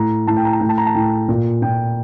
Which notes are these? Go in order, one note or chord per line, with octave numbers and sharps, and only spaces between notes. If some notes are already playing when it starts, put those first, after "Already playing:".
Already playing: A2 A#5
A2 A5
G5
A#5
A5
A2 G5
A5
A#5
A5
A2 G5
A#2
A#2 G5